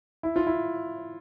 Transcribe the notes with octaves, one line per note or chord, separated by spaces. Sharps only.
E4
F4
E4